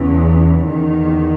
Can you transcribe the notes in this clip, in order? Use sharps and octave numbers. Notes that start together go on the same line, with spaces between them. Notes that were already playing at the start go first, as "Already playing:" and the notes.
Already playing: E2 C#3 E3
E2 D#3